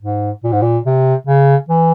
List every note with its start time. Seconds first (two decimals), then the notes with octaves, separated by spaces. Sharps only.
0.02 G#2
0.44 A#2
0.52 G#2
0.62 A#2
0.85 C3
1.27 C#3
1.69 E3